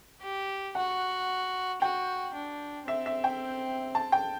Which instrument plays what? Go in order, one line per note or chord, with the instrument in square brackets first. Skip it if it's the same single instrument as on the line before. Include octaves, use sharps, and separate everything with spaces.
[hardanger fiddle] G4
[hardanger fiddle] F#4 [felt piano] F#5
[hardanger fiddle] F#4 [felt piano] G5
[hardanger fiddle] D4
[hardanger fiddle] C4 [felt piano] E5
[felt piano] E5
G5
A5
G5